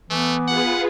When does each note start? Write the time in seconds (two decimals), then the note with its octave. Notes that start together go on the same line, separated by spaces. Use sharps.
0.10 E3 A3 B3
0.48 F4 G#4 B4 F#5